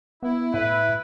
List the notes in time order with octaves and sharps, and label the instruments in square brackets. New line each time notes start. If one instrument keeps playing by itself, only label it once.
[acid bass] B3 [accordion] E4
[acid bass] A2 [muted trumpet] B4 [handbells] E5